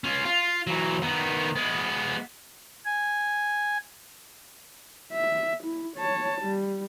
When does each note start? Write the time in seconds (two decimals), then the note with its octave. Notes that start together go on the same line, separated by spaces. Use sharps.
0.04 C#4 F4
0.25 F4
0.67 E3 F#3
1.02 D#3 B3
1.55 G#3 B3
2.85 G#5
5.13 E5
5.64 E4
5.97 C#5 A5
6.42 G3